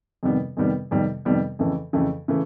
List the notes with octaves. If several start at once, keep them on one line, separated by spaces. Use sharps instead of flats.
F2 C3 D#3 G3 B3
F2 C3 D#3 G3 B3
F2 C3 D#3 G3 B3
F2 C3 D#3 G3 B3
F2 C#3 E3 A3
F2 C#3 E3 A3
C#3 E3 A3